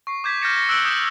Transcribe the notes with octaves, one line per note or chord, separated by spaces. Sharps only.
C#6 C7
D6 G6 G#6 B6
F6 G6 A6 A#6 C#7 E7
A#6 C#7
E6 F#6 C#7 D7 G7
D#6 G6 B6 E7 F#7